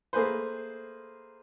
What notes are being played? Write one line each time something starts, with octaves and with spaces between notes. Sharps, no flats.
A3 A#3 G#4 B4 C5